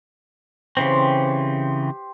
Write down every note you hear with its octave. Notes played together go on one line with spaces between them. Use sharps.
C#3 E3 C4 G4 C5